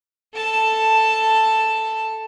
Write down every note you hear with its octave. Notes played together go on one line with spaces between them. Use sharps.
A4 A5